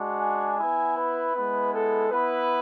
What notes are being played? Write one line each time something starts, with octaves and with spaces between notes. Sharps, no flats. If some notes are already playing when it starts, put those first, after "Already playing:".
Already playing: G#3 D4 F#4
G#5
B3 E4 G#5
B4
G#3 B3 E4
A4
B3 E4 B4